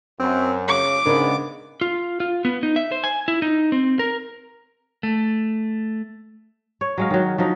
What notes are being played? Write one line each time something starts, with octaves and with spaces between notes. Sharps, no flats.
F#2 C4
C#3 D6
G#2 C#3 G#3 B3 D4 A#4
F4
F4
B3
D#4
E5
C5
G#5
E4
D#4
C4
A#4
A3
C#5
F#3 G#3 F5
D#3 F#3
F3 F#3 D#4